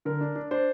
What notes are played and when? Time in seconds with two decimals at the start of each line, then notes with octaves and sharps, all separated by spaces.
0.05 D3 A#4
0.21 D4
0.35 D4
0.51 D4 C5